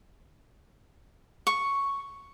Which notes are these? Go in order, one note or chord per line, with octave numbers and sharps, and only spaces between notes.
C#6